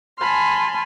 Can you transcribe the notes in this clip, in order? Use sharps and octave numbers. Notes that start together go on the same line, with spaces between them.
G#5 A5 B5 C6 F6